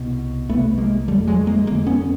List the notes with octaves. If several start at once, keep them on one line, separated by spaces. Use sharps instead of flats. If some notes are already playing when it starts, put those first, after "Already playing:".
Already playing: C2 B2
C2 B2 A3 B3
G#3 A#3
F2 D3 G3 A3
F#3 G#3
G#3 A#3
F2 D3 G#3 A#3
B3 C#4